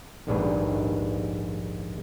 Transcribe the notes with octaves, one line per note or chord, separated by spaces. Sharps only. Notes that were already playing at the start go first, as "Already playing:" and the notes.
A#1 D#2 G#2 G3 D4 B4